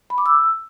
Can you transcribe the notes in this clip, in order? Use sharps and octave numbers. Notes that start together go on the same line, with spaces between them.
B5
D6
E6